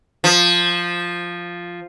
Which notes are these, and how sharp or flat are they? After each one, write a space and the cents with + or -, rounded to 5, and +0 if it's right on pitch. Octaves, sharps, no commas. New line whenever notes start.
F3 +0